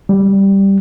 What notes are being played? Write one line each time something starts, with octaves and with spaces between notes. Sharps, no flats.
G3